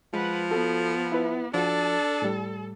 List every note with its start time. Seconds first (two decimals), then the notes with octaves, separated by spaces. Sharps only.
0.14 F3 G#3 B4 F#5
0.51 B3 F#4 A4
1.12 E4 B4 E5
1.54 F3 D4 F#4 A4
2.22 A2 G3